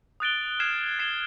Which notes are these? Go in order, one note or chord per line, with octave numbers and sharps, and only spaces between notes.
D#6 F#6 A6 D7 G7
F6 G#6 C7 E7 G7
G#6 C7 E7 G7